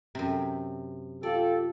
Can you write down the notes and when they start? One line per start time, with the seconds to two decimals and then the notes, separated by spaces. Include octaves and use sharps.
0.15 F#2 C3
1.23 F4 G4 A4 D5